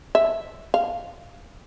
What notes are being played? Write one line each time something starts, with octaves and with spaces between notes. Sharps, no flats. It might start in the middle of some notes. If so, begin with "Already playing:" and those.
E5
F5